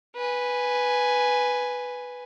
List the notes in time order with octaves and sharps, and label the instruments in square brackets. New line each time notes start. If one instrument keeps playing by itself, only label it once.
[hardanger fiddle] B4 G#5